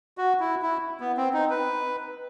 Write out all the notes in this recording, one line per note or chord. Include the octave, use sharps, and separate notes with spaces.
F#4
E4
E4
B3
C4
D#4
B4